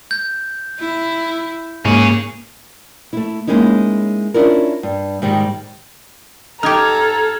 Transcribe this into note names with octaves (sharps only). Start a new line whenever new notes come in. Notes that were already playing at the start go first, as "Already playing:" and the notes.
G6
E4
G#2 A#3 G#4 C#5
A3 E4
G#3 A#3 C#4 D#4 E4
C#4 D4 E4 F4 A#4
G2
G#2 D#3 G3
D#4 G4 A4 A#5 F6 G#6